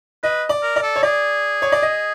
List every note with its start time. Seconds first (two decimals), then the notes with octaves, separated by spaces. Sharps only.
0.23 B4 D#5
0.49 D5
0.62 A#4
0.76 D5
0.82 A4
0.96 C#5
1.03 G#4 D5
1.62 C#5
1.72 D5
1.83 D#5